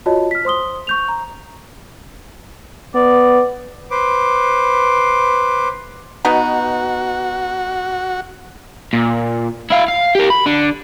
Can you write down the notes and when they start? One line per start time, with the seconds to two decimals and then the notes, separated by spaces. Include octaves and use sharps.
0.06 F4 F#4 C#5 D#5 A5
0.31 F6 B6
0.45 C5 C6 D#6 G7
0.87 C#6 G6 F7
1.08 A#5
2.95 B3 D5
3.91 B4 C5 D6
6.25 B2 B3 D#4 F#4
8.93 A#2
9.70 E4 F5
9.88 F5
10.15 G4 A#4
10.30 B5
10.46 D3